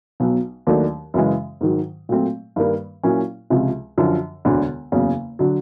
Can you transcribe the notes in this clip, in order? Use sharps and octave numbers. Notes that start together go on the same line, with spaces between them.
B1 B2 F#3
D#2 D#3 F#3 A3 D4
F#2 C#3 E3 G#3
G#2 D#3 F#3
A#2 F#3 A3 C4
G2 D#3 G3 A#3
A#2 F#3 A#3 C#4 E4
C#2 C3 F3 G#3
F#2 D3 F3
E1 D2 D3
F#1 E2 C#3 F#3
D3 F#3